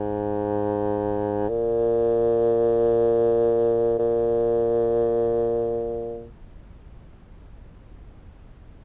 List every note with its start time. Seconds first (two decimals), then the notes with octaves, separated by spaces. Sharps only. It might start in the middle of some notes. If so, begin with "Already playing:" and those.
Already playing: G#2
1.49 A#2
3.99 A#2